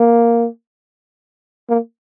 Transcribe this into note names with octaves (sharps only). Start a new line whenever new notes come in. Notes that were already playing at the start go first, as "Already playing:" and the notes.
Already playing: A#3
A#3